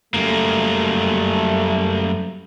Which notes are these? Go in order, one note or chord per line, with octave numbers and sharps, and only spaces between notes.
F#2 G3 A3 A#3